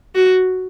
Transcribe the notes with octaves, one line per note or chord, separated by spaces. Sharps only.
F#4